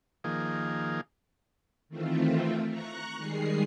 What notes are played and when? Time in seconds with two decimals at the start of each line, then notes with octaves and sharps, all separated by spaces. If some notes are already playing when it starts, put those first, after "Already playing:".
0.24 D#3 F3 A#3 G#4
1.89 D#3 E3 A3 C4 E4 F4
2.68 A#5 C#6 F#6
3.17 D#3 G3 G#3 G#4 C7